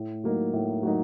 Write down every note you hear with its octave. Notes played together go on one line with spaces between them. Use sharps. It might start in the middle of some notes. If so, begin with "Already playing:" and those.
Already playing: A2
F#3 A#3 D#4
A2
F#3 A#3 D#4